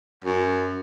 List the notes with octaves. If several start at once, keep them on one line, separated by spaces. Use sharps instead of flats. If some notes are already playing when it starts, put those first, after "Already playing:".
F#2